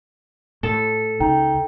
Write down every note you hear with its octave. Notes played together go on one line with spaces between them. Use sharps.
A2 A4
C#2 D#4 G5